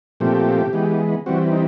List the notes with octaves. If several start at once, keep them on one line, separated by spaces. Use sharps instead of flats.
A#2 F3 A3 C4 G4
E3 G#3 B3
E3 G3 C4 F#4
D#4